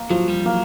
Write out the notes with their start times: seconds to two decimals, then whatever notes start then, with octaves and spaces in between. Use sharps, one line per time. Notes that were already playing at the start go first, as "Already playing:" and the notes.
Already playing: A#3
0.10 F3 F#3
0.28 G3
0.46 F#3 A#3